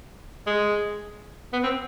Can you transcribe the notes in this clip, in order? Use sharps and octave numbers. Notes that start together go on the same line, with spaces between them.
G#3
B3
C4